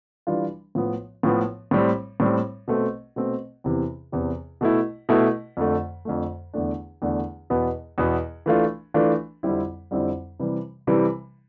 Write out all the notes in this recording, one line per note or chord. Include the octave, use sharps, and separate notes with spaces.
E3 G3 D4 F4
A2 F3 B3
A2 F3 B3
A2 G3 C4
A2 G3 C4
B2 A3 C4
B2 A3 C4
E2 C3 E3
E2 C3 E3
B2 A3 E4
B2 A3 E4
F2 D3 A3
F2 D3 A3
E2 D3 A3 D4
E2 D3 A3 D4
E2 B2 B3
E2 B2 B3
E3 A3 D4 F4
E3 A3 D4 F4
F2 D3 G3 C4 E4
F2 D3 G3 C4 E4
C3 E3 G3
C3 E3 G3